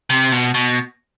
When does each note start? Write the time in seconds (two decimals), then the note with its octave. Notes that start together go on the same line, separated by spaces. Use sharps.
0.10 C3
0.32 B2
0.54 B2